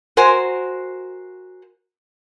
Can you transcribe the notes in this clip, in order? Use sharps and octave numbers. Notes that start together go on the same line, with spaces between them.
F#4 A#4 C5 G#5